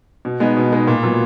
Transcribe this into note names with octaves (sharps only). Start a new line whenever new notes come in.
B2
G#3 B3 D#4
B2
G#3 B3 D#4
A#2
F#3 B3 F4